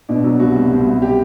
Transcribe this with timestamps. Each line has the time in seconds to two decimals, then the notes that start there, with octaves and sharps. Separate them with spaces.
0.09 B2 D4
0.24 F#3
0.40 C2 F#4
0.56 C2
0.71 C2
0.86 C2
1.02 G4